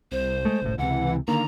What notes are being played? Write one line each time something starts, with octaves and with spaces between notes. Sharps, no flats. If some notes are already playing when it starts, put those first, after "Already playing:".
C2 C5
G#3 A3
F#1 C2 A2
C#2 C3 E3 F#5
D3 D#3 A#3 A#5